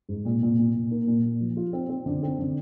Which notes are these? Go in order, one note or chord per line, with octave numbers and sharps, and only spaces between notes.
G#2
A#2
A#2
A#2
A#2
A#3
A#2
A#2
F3
F4
C4
C4
D3
C4
D3